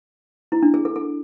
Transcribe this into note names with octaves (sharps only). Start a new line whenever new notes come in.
E4
D4
G#4
A4
A4